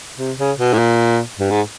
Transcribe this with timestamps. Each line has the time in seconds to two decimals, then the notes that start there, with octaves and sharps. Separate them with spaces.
0.17 C3
0.37 C#3
0.58 B2
0.73 A2
0.78 A#2
1.39 G2
1.50 G#2